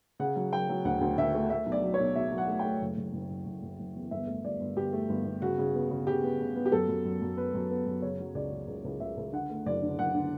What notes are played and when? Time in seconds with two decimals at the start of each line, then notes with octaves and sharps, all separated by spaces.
0.20 C#3 F#5
0.36 F#3
0.52 F#3 G5
0.69 F#3
0.85 D2 F#5
1.01 D2
1.18 D2 E5
1.35 A3
1.50 A3 E5
1.66 B1
1.72 D5
1.83 F#3
1.94 C#5
1.99 B1
2.16 B1 E5
2.31 F#3
2.38 F#5
2.48 A3
2.59 G5
2.65 A3
2.81 F#1
2.97 F#1
3.13 F#1
3.30 F#1
3.46 F#1
3.62 F#1
3.79 F#1
3.95 E2
4.11 G1 E5
4.27 A3
4.43 G1 D5
4.61 G1
4.76 G1 G4
4.93 A3
5.09 G1
5.25 G1
5.42 C#3 F#4
5.58 C#3
5.75 B3
5.90 C#3
6.07 C#3 G4
6.23 B3
6.39 C#3
6.56 B3
6.65 G4
6.72 F#2 A4
6.89 F#2
7.05 F#2
7.21 F#2
7.37 B3 B4
7.54 F#2
7.70 B3
7.86 F#2
8.02 C#3 C#5
8.19 F#3
8.35 C#2 D5
8.52 C#3
8.68 C#2
8.85 C#2
9.00 C#2 E5
9.17 C#2
9.33 D3 F#5
9.50 A3
9.66 F#1 D5
9.82 D3
9.99 F#1 F#5
10.15 D3